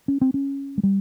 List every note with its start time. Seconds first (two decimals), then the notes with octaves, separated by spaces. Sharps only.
0.08 C#4
0.21 C4
0.34 C#4
0.78 G#3
0.83 G3